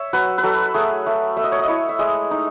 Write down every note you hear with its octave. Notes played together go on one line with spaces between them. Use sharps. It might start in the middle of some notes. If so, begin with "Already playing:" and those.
Already playing: C#5 E5
F#3 B4
B4
F#3 A4
A3 G#4
A3
A3 E5
D#5
C#5
D#5
E4 C#5
E5
G#3 D#5
D#4